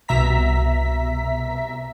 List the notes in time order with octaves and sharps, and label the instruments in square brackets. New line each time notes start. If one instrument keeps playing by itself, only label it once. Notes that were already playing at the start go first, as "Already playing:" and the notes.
[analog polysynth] C2 B2 E5 A#5 B6